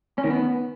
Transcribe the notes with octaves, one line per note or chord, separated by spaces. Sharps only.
C#4
D#3
B3